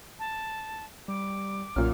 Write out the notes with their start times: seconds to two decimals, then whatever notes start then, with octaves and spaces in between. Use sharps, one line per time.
0.19 A5
1.08 G3 D6
1.76 B1 F#2 A#2 F6